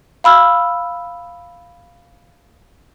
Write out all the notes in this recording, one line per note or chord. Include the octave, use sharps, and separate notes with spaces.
F5 B5 E6 F6